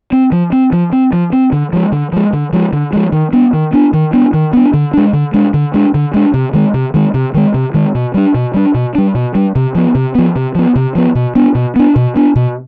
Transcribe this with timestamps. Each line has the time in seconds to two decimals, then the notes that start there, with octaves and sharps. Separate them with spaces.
0.12 C4
0.32 F3
0.52 C4
0.73 F3
0.92 C4
1.13 F3
1.33 C4
1.52 D3
1.73 F3 G#3
1.92 D3
2.13 F3 G#3
2.33 D3
2.53 F3 G#3
2.73 D3
2.93 F3 G#3
3.12 D#3
3.33 B3 D4
3.53 D#3
3.73 B3 D4
3.93 D#3
4.13 B3 D4
4.33 D#3
4.53 B3 D4
4.74 D3
4.93 G#3 D4
5.13 D3
5.34 G#3 D4
5.54 D3
5.74 G#3 D4
5.94 D3
6.14 G#3 D4
6.34 C3
6.54 D#3 G#3
6.74 C3
6.94 D#3 G#3
7.14 C3
7.34 D#3 G#3
7.54 C3
7.74 D#3 G#3
7.95 B2
8.14 G3 D4
8.34 B2
8.54 G3 D4
8.74 B2
8.95 G3 D4
9.15 B2
9.35 G3 D4
9.55 C3
9.75 F3 B3
9.95 C3
10.15 F3 B3
10.36 C3
10.55 F3 B3
10.76 C3
10.95 F3 B3
11.15 B2
11.35 B3 D4
11.55 B2
11.76 B3 D4
11.96 B2
12.16 B3 D4
12.36 B2